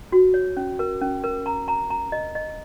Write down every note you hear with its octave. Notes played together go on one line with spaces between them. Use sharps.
F#4
C#5
C#4
A#4
C#4
A#4
A#5
A#5
A#5
D#5
D#5